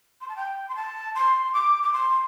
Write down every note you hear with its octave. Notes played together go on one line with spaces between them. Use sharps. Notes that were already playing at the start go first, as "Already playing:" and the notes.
C6
A5
G5
C6
A5
C6
D6
D6
C6